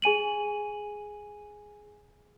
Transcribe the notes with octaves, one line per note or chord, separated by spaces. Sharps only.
G#4 G#5 D#7 F#7